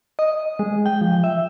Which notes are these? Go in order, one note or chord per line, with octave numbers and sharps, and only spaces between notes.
D#5
G#3
G5
F3
E5